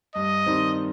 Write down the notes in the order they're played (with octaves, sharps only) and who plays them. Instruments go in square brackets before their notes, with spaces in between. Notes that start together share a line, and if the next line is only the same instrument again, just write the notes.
[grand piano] G2 [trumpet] D#5
[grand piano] D#3 G3 C4 D#4